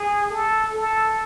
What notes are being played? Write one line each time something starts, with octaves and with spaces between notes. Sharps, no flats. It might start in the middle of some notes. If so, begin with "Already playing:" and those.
Already playing: G#4
A4
A4